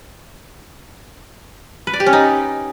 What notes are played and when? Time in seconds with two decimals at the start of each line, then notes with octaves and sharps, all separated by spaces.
1.87 B4
1.93 D5
2.00 G4
2.06 C#4
2.13 D#4